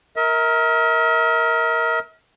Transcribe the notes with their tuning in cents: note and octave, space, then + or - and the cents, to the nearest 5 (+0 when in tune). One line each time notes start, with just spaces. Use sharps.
A#4 +0 E5 -45